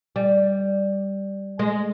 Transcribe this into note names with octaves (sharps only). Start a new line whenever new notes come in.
G3
G#3